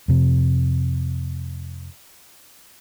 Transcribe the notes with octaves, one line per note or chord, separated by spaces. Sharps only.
F2 C3